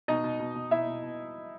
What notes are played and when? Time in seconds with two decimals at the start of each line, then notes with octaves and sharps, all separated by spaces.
0.08 B2 D#4 D#5
0.24 B2
0.40 B2
0.55 B2
0.71 B2 E4 E5
0.87 B2
1.03 B2